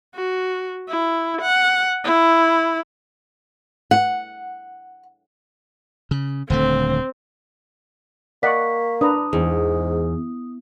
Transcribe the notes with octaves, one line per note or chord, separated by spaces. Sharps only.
F#4
E4
F#5
E4
F#5
C#3
D#1 D3 A3 C4
A#3 D5 D#5 F#5 C#6 B6
D4 B4 A#5 D#6
E2 G#2